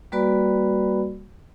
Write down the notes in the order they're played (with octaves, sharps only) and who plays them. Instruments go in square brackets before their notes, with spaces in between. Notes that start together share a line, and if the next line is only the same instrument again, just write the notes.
[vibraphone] G3 A#3 F#4 B4 D5 B5